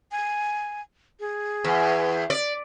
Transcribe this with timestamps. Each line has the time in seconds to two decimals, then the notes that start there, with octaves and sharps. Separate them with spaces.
0.12 G#5
1.20 G#4
1.64 E2
2.30 D5